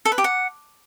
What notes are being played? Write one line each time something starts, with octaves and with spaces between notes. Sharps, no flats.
A4
B4
G4
F#5